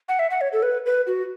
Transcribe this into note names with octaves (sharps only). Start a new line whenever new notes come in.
F#5
E5
F#5
C#5
A4
B4
B4
F#4